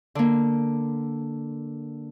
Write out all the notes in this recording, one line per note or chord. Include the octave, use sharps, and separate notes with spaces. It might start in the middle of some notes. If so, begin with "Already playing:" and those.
D3 A#3